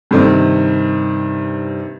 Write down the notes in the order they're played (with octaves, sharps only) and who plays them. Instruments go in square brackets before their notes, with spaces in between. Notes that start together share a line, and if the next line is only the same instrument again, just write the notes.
[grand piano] G2 C3 D#3